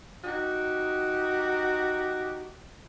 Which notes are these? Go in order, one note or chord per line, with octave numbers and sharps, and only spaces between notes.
D#4 F#4 G4